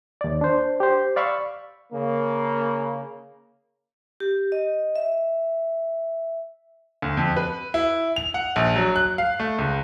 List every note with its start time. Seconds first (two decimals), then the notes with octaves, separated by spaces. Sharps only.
0.21 D#2 D5
0.41 D4 C5
0.80 G4 C5
1.16 D5 F5 B5 C#6 E6
1.93 C#3 A#3
4.20 G4
4.52 D#5
4.96 E5
7.02 D2
7.17 F2
7.36 B4
7.74 E4
8.16 F7
8.34 F#5
8.56 A#1
8.76 F#3
8.96 F#6
9.18 F5
9.40 A3
9.58 C#2